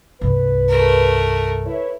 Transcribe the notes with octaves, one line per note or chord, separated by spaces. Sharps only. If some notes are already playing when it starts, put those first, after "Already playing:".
C2 G2 B4
A3 A#4
E4 B4 C#5